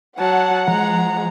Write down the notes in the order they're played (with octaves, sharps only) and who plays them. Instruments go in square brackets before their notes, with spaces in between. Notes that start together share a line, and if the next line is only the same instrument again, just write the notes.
[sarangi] F#3 [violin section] F#5 [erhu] A5
[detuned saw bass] F3 [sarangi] G#3 [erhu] A#5